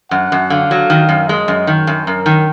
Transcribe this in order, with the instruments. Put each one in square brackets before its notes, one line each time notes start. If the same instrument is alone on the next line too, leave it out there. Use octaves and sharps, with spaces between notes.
[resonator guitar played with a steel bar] F#2 [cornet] F#5
[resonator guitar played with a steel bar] F#2
[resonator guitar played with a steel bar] D3 [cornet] F5
[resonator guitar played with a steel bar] F#3
D#3
F#2
[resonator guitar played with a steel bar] G#3 [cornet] D#5
[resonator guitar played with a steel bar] F#2
D#3
F#2
[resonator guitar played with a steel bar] F#2 [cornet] A#4
[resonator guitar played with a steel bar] D#3